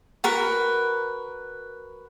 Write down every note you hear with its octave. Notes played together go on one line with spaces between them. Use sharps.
F#4 A#4 B4